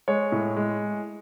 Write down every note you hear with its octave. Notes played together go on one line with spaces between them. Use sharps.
G#3 C#5
A2
G#3